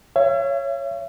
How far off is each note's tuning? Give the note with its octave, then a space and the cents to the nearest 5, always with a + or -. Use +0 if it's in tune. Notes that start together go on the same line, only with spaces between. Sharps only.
C#5 +0 E5 +45